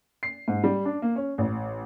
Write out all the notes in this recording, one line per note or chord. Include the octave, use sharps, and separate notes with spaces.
C7
G#2
G3
D4
A#3
C#4
A1